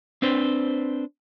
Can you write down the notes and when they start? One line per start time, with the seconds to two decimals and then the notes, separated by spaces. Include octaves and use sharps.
0.22 C4 D4 B4 C5